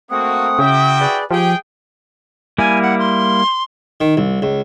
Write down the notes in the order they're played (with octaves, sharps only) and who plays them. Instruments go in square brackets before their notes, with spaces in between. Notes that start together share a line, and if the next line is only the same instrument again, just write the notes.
[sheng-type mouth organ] A3 C4 F#5 [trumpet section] A#3 F#4 [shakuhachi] D#6
[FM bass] C#3 [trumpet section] E4 F#4 G5 [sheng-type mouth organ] E5
[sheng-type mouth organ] G#4 B4 D5
[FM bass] F3 [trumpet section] G#3 G#4 G5 [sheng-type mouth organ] G4
[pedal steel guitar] G3 A#3 E4 [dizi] G#5
[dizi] F#5
C6
[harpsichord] D#3
C2
C#2